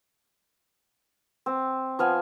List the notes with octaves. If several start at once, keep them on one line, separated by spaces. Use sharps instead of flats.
C4
F3 B3 F5 G#5